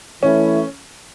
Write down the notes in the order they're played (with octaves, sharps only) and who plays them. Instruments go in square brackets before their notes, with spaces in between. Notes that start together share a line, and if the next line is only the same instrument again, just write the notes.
[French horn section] E3 A3 E4 [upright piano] C#4